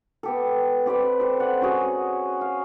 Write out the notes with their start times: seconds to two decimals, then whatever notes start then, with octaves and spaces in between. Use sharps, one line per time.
0.23 B3 G4 A4
0.86 C4 G4 B4 D5
1.20 A4 C5
1.40 D5 F#5
1.61 C#4 F#4 G#4
2.41 F5